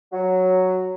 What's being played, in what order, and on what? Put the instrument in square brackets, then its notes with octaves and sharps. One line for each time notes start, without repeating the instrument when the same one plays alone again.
[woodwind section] F#3